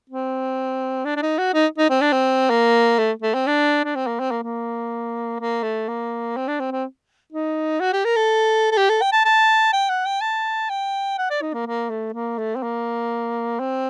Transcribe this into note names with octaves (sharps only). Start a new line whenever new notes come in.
C4
D4
D4
D#4
F#4
D#4
D#4
C4
D4
C4
A#3
A3
A3
C4
D4
D4
C4
A#3
C4
A#3
A#3
A#3
A3
A#3
C4
D4
C4
C4
D#4
F#4
G4
A#4
A4
A4
G4
A4
G5
A5
A5
G5
F#5
G5
A5
G5
F#5
D5
D#4
A#3
A#3
A3
A#3
A3
C4
A#3
C4